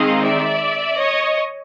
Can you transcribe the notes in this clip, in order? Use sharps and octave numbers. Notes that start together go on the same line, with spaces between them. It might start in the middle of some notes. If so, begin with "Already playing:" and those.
Already playing: D#3 G#3 C4 D#4 D#5 F5
D5 E5
C#5 D#5